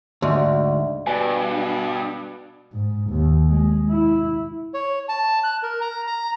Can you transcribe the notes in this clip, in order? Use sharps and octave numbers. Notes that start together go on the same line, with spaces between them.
D2 G#2
G2 B2 B4 D5 G#5
G#2
D#2
G#3
E4
C#5
A5
F#6
A#4
A#5
A#5